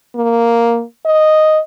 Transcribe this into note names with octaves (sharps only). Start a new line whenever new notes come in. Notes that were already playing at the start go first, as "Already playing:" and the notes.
A#3
D#5